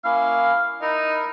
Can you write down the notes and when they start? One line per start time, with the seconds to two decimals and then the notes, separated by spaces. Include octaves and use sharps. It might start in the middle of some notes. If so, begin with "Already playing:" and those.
0.05 A#3 C#4 E4 F5
0.82 D#4 E4 A#4